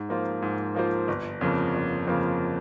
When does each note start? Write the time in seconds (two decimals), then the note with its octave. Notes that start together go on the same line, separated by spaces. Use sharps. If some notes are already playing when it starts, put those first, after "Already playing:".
Already playing: G#2
0.09 F3 A#3 F4 C5
0.42 G#2
0.75 F3 A#3 F4 C5
1.08 G1
1.41 F2 C#3 F3 A#3
1.74 G1
2.06 F2 C#3 F3 A#3